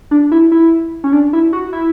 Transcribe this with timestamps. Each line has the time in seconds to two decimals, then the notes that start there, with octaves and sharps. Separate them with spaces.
0.11 D4
0.32 E4
0.52 E4
1.04 C#4
1.13 D4
1.33 E4
1.53 F#4
1.73 E4